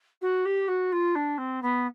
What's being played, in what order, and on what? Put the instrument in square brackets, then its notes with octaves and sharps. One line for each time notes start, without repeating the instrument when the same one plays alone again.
[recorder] F#4
G4
F#4
F4
D4
C4
B3